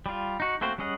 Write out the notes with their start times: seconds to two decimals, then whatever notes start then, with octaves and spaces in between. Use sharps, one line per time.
0.06 G3 F4
0.40 D#4 F#4
0.61 A3 A#3 C4 F#4 C5
0.78 G3 C#4 G#4 D#5 F#5